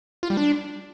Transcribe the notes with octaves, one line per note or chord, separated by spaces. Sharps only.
F4
G3
D4